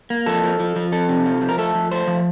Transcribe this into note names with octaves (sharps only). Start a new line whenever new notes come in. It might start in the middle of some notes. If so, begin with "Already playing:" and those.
A#3
F3 A4
F3
F3
F3
F2 A4
C3
F3
F3
A#4
A3 A4
F3
A3 C5
F3